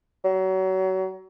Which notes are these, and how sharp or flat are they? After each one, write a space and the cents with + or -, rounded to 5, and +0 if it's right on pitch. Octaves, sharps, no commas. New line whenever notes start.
F#3 +30